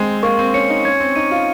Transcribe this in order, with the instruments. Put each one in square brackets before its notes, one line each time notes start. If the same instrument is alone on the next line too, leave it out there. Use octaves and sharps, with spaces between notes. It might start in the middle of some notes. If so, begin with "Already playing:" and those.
Already playing: [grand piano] G#3 C4
[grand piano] A#3 [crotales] C#6
[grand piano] C4
[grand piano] C#4 [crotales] C#7
[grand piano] D#4
[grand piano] C#4 [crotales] G#6
[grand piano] C4
[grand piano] D#4 [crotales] D#7
[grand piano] F4